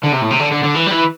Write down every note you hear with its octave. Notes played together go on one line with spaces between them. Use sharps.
D3
C3
A2
C3
D3
D3
D3
E3
G3
E3